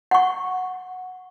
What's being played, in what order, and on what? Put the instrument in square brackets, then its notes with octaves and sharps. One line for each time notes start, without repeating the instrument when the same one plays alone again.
[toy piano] F#5 C#6